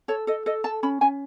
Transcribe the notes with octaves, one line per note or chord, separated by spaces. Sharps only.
A4 C#5
A4 D#5
A4 D#5
A4 A5
C#4 B5
C#4 G#5